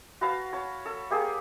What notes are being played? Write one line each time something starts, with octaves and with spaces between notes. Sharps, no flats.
F#4 B4 F5 A5
C#5 A5
A4
A#3 G4 G#4